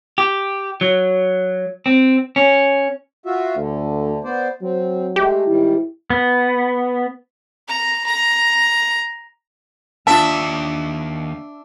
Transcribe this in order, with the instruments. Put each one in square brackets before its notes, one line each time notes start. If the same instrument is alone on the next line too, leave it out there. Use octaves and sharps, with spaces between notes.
[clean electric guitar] G4
F#3
C4
C#4
[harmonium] F4 F#4 E5
[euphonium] D2 [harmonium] D3
[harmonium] B3 C5 D5
[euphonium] F#3 [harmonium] C4
[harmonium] G#3 A3 [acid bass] G4
[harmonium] G#2 D#3 G3 [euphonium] E4
[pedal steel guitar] B3
[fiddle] A#5
A#5
[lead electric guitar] D#2 [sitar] D4 E5 [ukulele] F4 A5